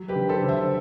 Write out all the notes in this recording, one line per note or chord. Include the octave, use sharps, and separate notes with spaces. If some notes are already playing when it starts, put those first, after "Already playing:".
Already playing: F#3
G4 B4
D3
A4 C5
D3
C5 E5